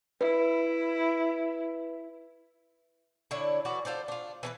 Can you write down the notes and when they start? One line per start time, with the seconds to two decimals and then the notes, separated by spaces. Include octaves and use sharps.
0.21 E4 B4
3.31 D3 D4 E4 C#5
3.65 E3 F#4 D5
3.85 F4 A4 C5 D5
4.08 D4 F4
4.43 E3 D4 B4